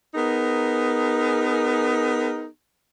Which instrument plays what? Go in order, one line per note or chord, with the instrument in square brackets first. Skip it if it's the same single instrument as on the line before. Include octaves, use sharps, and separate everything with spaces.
[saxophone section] B3 D#4 G#4 A#4